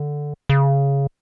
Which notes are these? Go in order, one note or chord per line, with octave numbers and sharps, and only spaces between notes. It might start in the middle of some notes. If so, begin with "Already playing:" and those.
Already playing: D3
C#3